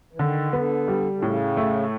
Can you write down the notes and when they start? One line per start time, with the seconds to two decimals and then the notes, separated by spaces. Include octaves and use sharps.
0.13 E3
0.18 D3 D#3
0.53 D3 B3
0.88 G3
1.12 D3
1.22 A2 C#3
1.57 A3